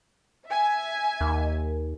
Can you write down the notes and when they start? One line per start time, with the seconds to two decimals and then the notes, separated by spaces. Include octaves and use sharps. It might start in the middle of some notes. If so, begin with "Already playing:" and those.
0.48 E5 G#5
1.21 D#2